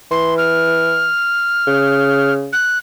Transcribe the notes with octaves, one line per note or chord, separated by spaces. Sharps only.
E3 C6
F6
C#3
F#6